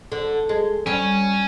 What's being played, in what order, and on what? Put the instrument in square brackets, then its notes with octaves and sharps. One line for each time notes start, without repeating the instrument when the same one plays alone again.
[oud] D3
G#3
[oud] G3 [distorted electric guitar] C#4